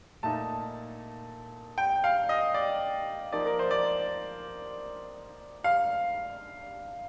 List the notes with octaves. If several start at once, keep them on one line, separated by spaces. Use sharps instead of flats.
A#2 A3 D#4 A5
G5
F5
D#5
D5
F3 A#3 D#4 D5
A#4
C5
D5
F5